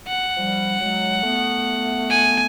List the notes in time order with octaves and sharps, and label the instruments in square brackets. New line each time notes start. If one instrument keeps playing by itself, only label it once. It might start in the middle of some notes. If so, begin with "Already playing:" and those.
[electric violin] F#5
[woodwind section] F3 G3
F#3 G#3
A3 B3
[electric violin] G#5